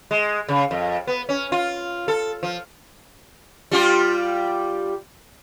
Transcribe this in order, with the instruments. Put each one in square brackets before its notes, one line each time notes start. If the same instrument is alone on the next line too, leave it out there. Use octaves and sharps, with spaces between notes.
[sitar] G#3
C#3
F2
B3
C#4
F4
A4
F3
G3 F4 G4